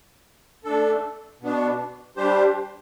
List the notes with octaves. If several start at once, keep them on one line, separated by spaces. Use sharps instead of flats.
A3 D4 A4
B2 B3 D4
G3 D4 G4 C5